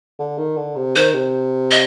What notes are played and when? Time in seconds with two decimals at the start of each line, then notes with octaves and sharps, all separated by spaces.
0.19 D3
0.38 D#3
0.57 D3
0.76 C3
0.96 D#3 C5
1.14 C3
1.71 D#5